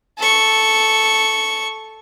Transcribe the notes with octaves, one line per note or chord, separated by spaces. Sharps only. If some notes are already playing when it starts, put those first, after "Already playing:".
A4 C#6